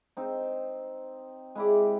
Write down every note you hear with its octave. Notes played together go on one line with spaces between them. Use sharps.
C4 D#4
G#3 E4 G4 D5